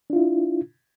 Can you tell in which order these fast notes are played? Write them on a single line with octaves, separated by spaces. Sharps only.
D4 F4 E4